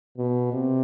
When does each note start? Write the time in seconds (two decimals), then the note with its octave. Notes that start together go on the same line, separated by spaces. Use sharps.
0.17 B2
0.53 C3